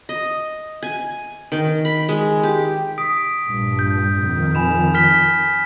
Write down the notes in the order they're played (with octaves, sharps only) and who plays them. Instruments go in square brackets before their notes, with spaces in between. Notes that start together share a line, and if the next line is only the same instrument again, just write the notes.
[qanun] D#5
G#5
D#3
B5
G#3
G4
[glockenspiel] D#6 B6 D7
[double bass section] A#1 G2 A#2
[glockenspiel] G6
[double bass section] F2 D#3
[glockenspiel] G#5 B5 E7
F6 B6 G7